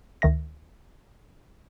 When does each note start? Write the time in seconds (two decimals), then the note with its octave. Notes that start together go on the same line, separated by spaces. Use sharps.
0.22 D2 D#3 E5 A#6